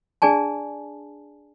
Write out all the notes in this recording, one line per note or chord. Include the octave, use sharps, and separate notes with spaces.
D4 G#4 D5 G#5 A5